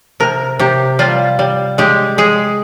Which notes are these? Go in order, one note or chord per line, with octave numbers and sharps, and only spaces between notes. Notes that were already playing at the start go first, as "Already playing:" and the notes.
C3 A#4
C3 G4
G3 F4
G3
G#3 G4
G#3 G#4